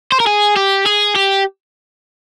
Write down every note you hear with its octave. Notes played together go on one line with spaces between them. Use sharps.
C5
A#4
G#4
G4
G#4
G4